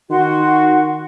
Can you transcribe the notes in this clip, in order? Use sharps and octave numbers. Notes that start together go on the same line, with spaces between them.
D#3 F#4 C6